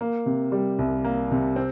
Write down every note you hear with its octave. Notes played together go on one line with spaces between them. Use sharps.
A#3
C3
G3
C2
A#3
C3
C4